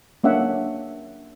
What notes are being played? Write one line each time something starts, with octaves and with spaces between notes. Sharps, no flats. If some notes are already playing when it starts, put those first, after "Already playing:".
A#3 C#4 D4 E5 F#5